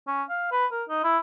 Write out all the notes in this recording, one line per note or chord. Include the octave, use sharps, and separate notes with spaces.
C#4
F5
B4
A#4
D#4
E4